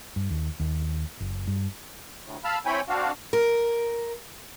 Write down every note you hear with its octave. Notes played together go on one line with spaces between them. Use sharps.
G2
D#2
D#2
F#1
G2
D2 A2
F5 A5 B5 E6 F6
C4 E4 C#5 G5 G#5 B5
C4 D4 F#4 F5
A#4